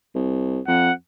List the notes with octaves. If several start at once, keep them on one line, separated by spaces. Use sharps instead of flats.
C2
F2 F#5